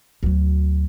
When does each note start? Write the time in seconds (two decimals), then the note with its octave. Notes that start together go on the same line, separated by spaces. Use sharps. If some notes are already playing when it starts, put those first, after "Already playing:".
0.23 D2 F#3